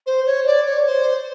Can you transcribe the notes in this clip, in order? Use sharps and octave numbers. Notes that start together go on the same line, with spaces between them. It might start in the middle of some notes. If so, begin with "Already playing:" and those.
C5
C#5
D5
C#5
C5